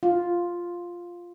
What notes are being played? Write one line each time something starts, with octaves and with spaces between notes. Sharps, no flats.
F4